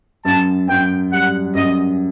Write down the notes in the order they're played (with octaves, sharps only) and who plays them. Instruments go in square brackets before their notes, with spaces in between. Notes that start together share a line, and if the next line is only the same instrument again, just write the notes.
[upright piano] F#2 [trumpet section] A5
[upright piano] F#2 [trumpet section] G5
[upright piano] G3 [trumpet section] F#5
[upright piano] F#2 [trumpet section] D#5